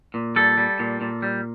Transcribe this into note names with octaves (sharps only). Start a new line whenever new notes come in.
A#2
G3 A4
G3
A#2
A#2
G3